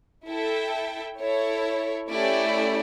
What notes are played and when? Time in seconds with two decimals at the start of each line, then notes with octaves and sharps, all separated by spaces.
0.28 E4 A4 E5 G5
1.20 E4 A4 C#5
2.10 A3 C#4 E4 G4 D5